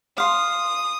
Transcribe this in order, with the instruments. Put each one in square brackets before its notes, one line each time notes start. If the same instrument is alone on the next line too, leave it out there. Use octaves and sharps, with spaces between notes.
[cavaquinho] F5 C6 [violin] D#6